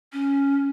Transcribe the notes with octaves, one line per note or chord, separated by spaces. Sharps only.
C#4